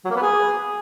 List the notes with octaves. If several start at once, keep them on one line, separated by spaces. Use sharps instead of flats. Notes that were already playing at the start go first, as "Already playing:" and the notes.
F#3
A#3
B3
G#4